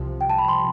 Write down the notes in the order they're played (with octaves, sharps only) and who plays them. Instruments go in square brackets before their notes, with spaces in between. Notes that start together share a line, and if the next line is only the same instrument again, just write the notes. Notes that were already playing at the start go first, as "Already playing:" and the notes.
Already playing: [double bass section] C2 C3 F3
[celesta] G5
A5
B5
C6